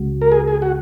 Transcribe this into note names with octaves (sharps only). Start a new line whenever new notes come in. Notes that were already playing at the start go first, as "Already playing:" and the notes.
Already playing: C#2 C#3 G#3 F#4
A#4
G#4
G#4
F#4